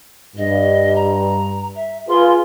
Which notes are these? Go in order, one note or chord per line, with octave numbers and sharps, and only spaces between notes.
G2 D#5
A#5
E5
F4 G#4 B4 C6